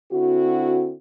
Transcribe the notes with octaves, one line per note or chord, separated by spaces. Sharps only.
D3 C4 E4 F#4